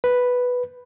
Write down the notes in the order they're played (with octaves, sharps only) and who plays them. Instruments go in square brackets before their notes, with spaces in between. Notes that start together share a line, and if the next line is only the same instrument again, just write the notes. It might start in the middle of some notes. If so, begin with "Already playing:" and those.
[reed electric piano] B4